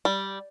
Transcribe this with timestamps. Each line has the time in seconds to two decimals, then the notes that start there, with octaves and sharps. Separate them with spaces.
0.05 G3